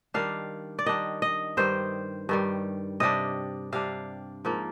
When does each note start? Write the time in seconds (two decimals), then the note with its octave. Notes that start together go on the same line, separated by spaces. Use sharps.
0.14 D#3 G3 D4 F5
0.79 D5
0.86 D#3 G3 D4 D#5
1.22 D#5
1.57 G2 D#3 G3 C5
2.29 G2 D#3 G3
3.00 C3 G3 D4 D#5
3.73 C3 G3 D4 F5
4.45 G#2 F3 A#3